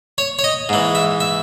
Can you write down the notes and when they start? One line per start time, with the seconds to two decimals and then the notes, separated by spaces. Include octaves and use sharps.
0.18 C#5
0.39 C#5
0.44 D#5
0.69 G#2 E3
0.95 E5
1.20 E5